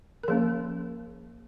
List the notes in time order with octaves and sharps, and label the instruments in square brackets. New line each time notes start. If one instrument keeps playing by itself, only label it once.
[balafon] A#4
F3 A#3 C#4 G#4